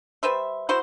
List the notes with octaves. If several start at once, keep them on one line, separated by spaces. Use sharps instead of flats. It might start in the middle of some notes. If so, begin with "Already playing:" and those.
G3 B4 C5 E5
E4 F#4 C5